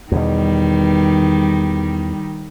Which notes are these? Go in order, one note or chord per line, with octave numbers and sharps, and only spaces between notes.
E2 B2 D#3 G3